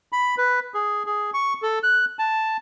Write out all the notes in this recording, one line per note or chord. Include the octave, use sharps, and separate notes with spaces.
B5
B4
G#4
G#4
C#6
A4
F#6
A5